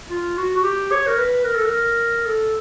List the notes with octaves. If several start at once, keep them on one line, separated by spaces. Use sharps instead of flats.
F4
F#4
F#4
G4
C#5
A#4
B4
A#4
A4
A#4
A4